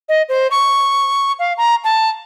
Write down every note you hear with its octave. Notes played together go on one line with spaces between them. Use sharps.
D#5
C5
C#6
F5
A#5
A5